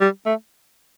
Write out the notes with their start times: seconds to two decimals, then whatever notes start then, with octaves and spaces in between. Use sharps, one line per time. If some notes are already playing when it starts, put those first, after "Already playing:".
0.01 G3
0.26 A3